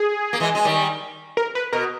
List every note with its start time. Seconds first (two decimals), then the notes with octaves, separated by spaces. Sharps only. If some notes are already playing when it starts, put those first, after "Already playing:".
Already playing: G#4
0.33 A#3
0.40 E3 G#3
0.55 G#3
0.65 D#3 G3
1.37 A#4
1.55 B4
1.72 B2 A#4